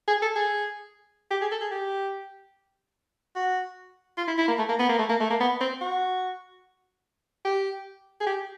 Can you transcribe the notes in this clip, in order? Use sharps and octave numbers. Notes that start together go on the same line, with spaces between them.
G#4
A4
G#4
G4
G#4
A4
G#4
G4
F#4
F4
E4
E4
A#3
A3
A#3
B3
A#3
A3
A#3
A3
A#3
B3
C4
F#4
G4
G#4
G4